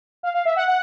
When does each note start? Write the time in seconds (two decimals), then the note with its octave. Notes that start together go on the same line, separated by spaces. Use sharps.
0.23 F5
0.34 F5
0.45 E5
0.56 F#5
0.68 F#5